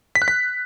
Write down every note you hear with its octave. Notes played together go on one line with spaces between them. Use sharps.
B6
F#6
B6